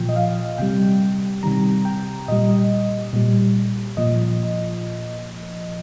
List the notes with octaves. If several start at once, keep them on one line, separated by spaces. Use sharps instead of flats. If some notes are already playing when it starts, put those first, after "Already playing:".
Already playing: A#2 F3 G5
D#5
F5
C3 G3 G5
C3 D#3 G3 A#5
G5
A#2 G3 D#5
A#2 G3
A#2 F3 D#5